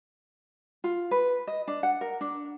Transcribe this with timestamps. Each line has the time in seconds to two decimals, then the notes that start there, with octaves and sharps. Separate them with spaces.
0.84 F4
1.11 B4
1.47 D#5
1.67 D4
1.83 F#5
2.01 A#4
2.21 D4